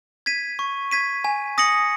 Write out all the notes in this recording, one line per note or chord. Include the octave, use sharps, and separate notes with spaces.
G#6 B6 D#7
C#6
G#6 B6 D#7
G#5
D#6 A#6 C#7 F#7